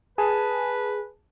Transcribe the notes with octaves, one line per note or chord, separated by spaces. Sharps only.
G#4 B4 G#5 A5